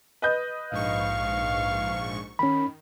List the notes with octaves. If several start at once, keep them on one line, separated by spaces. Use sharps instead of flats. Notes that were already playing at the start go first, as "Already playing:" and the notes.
B4 D#5 G6
A#1 G#2 F5 C#6
D#3 C#4 B5